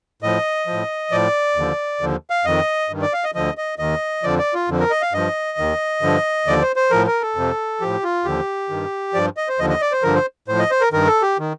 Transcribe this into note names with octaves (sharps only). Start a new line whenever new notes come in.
A2 F3 D#5
F3
A2
A2 F3 D5
D#2 D3 F3
D#2 D3 F3
F5
F2 D#3 D#5
G2 D#3
D5
F5
D#5
D2 D3 F3 D#5
D#5
D#2 D#3 D#5
F2 D3 F3 D5
D5
F4
F2 D3 F3
A#4
D#5
F5
G2 F3 D#5
D#2 D#3
G2 D3 F3
D#2 D3 F3 D5
C5
C5
A2 F3 A#4
A#4
A4
F2 C3 F3
A2 F3 G4
F4
D#2 D3 F3 G4
G2 D#3
G2 F3 D5
D#5
C5
D#2 D3 F3 D#5
D#5
D5
C5
G2 D3 F3 A#4
C5
A2 F3 C5
D#5
C5
A#4
G2 D#3 A#4
A4
G4
D#3